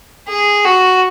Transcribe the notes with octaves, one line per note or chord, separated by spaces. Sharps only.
G#4
F#4